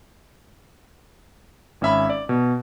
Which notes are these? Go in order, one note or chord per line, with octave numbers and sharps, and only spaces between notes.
G#1 C#4 E5 B5
D5
B2